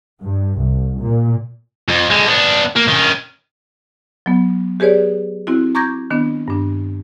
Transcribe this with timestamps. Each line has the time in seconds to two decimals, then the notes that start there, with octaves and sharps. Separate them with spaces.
0.22 G2
0.59 C2
1.00 A#2
1.88 F2
2.10 D3 G#3
2.28 B3 D4
2.76 A#3
2.88 D#3 C#4
4.26 F#3 B3
4.80 G4 G#4 B4 C#5 D5
5.47 C4 E4 F#4
5.75 A#5 C#6 D6 G6 G#6 A#6
6.11 D#3 B3 D4
6.48 G2 D4